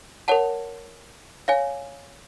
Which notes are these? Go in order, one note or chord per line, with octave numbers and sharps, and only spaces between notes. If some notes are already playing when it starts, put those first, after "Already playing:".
A#4 C#5 F#5 A5
C#5 F5 G#5